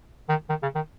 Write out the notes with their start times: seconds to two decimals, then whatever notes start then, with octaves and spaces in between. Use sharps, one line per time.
0.29 D#3
0.49 D#3
0.62 C#3
0.75 D#3